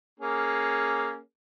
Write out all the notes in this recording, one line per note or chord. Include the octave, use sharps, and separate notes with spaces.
A#3 C#4 G#4